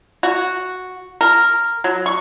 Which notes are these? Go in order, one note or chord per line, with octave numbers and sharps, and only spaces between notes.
F#4
A#4
F#3
C#6